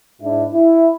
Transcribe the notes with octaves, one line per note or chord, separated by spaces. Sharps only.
G#2 D4 E4
E4